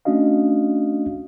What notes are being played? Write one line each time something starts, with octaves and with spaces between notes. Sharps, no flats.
A3 C#4 D4 F#4 D#5 F5